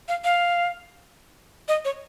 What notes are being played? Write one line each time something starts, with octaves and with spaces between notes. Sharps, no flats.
F5
F5
D#5
C#5